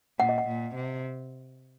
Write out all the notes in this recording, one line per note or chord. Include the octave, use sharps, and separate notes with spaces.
A#2 F#5
D#5
F#5
A#2
C3